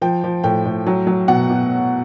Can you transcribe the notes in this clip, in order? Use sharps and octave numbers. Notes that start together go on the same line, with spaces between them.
F3 G5
F3
A2 G5
A2
F#3
F#3
B2 F#5
B2